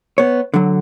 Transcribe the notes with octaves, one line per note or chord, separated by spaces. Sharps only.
B3 C#5
D3 F#3